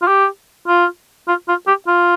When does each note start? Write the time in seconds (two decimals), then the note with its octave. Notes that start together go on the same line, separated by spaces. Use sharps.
0.02 F4
0.07 G4
0.68 F4
1.28 F4
1.48 F4
1.67 G4
1.87 F4